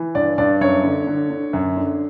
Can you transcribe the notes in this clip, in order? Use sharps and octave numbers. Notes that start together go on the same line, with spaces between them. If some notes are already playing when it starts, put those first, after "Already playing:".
Already playing: E3
G2 D5
G2 D5
F#2 C#5
D3
D3
D3
F#2
D3